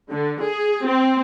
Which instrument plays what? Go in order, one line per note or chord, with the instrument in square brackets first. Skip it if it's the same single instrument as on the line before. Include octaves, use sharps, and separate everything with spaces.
[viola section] D3
G#4
C4